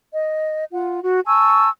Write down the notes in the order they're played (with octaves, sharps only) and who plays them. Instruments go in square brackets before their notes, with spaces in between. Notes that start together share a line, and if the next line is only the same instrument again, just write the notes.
[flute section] D#5
F4 F#5
F#4
G#5 A5 C#6 E6